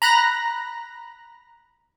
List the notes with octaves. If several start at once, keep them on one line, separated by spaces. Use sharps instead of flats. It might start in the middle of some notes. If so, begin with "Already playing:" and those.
A#5 B5 F#6 A#6